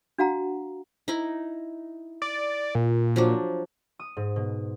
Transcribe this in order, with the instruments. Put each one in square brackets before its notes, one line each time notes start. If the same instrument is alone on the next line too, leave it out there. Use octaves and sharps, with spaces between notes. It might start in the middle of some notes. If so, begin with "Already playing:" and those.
[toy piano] D4 F#4 F5 F#5 A#5
[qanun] D#4 E4
[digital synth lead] D5
A#2
[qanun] F3 F#3 D4
[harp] D#6
G#2
B2